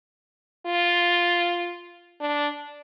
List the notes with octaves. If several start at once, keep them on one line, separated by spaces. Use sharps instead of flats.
F4
D4